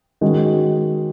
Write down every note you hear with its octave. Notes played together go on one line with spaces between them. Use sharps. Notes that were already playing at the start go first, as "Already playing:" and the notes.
D#3 G#3 C#4 F#4